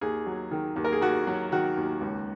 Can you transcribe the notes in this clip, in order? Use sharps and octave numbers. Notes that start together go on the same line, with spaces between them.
D#2 G#4
F#3
D#3
D#2
A#4
G#4
D#2 F#4
F#3
D#3 F#4
D#2
C#2